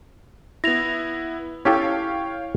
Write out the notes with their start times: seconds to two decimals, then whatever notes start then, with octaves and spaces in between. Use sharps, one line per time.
0.64 B3 E4 A#6 F7
1.65 C#4 E4 G4 A4 C#5 F5 G5